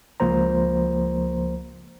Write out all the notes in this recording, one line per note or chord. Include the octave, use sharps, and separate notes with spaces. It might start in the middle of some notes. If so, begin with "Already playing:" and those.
C#2 F3 A#3 C5 A#5